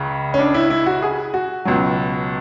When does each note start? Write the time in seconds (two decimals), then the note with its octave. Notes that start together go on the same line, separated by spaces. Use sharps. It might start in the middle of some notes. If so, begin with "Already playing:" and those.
Already playing: C#2 C#3
0.34 C#4
0.39 D4
0.54 E4
0.70 E4
0.86 F#4
1.02 G#4
1.34 F#4
1.65 C#2 B2 F#3